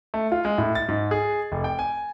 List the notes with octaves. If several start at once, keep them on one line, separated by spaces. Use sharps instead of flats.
A3
F4
G#3
A2
A6
G#2
G#4
F1
G5
G#5